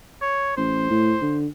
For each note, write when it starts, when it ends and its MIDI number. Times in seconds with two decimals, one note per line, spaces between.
0.22 0.57 73
0.57 0.87 33
0.57 1.40 72
0.90 1.16 45
1.22 1.47 50